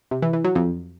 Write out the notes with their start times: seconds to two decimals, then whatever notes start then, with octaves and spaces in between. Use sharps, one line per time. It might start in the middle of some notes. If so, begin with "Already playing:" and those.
0.11 C3
0.22 E3
0.33 E3
0.44 F#3
0.55 F2